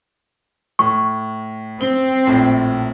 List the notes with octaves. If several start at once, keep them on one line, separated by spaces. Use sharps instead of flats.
A2 C#6
C4 G7
A#1 A2